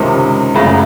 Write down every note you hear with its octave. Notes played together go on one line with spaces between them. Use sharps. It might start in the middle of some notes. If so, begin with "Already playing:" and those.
Already playing: C#2 C3 D#3
F#2 C#3 A3